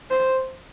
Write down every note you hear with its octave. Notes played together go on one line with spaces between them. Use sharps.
C5